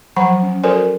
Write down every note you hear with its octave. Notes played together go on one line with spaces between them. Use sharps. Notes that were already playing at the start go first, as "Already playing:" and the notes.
F3 F#3 F#5 A#5 B5
C#4
F#4 A4 A#4 C5 D5 G#5